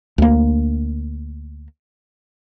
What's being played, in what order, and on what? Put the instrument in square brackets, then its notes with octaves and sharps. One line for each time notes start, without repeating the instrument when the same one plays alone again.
[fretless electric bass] D2 A#3